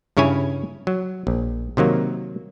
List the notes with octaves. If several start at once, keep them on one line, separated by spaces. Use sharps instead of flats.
G2 C#3 E4 C#5 G#5
F#3
A#1
C3 D#3 F#3 A#3